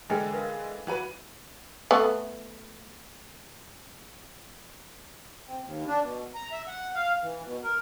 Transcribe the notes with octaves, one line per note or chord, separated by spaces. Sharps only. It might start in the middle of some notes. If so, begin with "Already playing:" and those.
D3 E3 G#3 B4 G5 G#5
A#4 B4 F5
E3 F#4 B4
A3 B3
C4
D#2
D4
B2
A#5
E5
F#5
F5
E3
B2
A#4